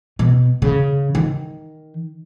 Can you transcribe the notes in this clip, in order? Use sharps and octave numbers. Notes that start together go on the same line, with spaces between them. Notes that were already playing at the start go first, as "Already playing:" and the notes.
B2
C#3
D#3